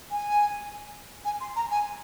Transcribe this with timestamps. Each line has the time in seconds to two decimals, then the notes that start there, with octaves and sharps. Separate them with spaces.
0.11 G#5
1.25 G#5
1.41 C6
1.56 A#5
1.71 G#5